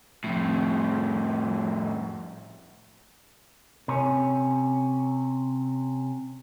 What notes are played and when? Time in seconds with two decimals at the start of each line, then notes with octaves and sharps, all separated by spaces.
0.24 F2 A2
3.88 C3 C#4